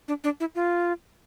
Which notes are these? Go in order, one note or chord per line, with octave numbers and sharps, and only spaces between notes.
D4
D4
E4
F4